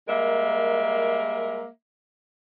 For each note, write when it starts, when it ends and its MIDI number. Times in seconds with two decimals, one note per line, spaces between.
0.08 1.67 55
0.08 1.67 56
0.08 1.67 58
0.08 1.67 70
0.08 1.67 76